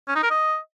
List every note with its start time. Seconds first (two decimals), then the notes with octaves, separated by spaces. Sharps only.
0.08 C#4
0.16 D#4
0.23 A#4
0.30 D#5